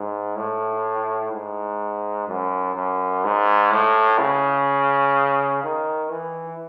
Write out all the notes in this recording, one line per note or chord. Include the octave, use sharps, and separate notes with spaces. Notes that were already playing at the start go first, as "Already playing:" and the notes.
Already playing: G#2
A2
G#2
F#2
F#2
G#2
A2
C#3
D#3
E3